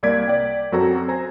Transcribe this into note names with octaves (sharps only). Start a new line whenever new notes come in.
C2 A#3 D5 G#6 B6 D7
D5 G5
F#2 C4 F#4 A4 A#5
C5 G#5 A#5